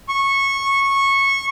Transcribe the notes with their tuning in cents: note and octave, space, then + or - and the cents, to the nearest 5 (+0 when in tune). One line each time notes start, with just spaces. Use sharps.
C#6 -15